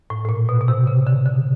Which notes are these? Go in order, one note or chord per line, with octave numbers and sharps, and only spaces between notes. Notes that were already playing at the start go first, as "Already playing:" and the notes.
A2
A2
A#2
B2
B2
C3
C#3
D3
D3